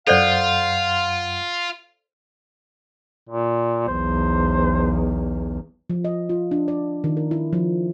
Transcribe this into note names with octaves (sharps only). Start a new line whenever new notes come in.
F#2 F4 A4 C5 D5 F5 F#5 G6
A#2
B1 E2 C5
F3
D#5
F4
D4
D5
D#3
A#4
E4
F3